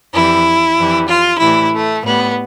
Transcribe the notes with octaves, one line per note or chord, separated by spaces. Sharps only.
F2 E3 G3 E4
F2 E3 G3
F4
A2 E3 G3 E4
A3
A2 G3 B3